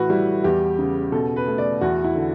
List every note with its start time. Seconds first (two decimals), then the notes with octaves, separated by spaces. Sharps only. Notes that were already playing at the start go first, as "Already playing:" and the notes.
Already playing: A2 E3 F#4 B4
0.10 G3 E4
0.44 E2 G4
0.79 C#3
1.12 B2 A4
1.36 B4
1.48 A3
1.58 D5
1.81 E2 F#4
2.04 E4
2.15 D3